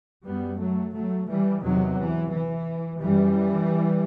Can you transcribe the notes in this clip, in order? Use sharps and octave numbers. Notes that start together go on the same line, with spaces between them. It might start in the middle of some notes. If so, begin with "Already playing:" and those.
F#2 G3 B3
F#3 A3
F#3 A3
E3 G3
E2 C3 D#3 F#3
E3
E3
F#2 E3 G3